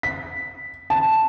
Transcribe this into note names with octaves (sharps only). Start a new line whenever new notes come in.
B6
A5